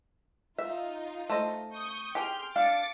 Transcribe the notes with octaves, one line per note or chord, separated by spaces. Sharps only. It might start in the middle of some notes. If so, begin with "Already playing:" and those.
D#4 F4 E5
A3 C5 D#5
C#6 D#6 G6
G4 G#4 G5 C6 F6
D4 F5 D6 A6 C#7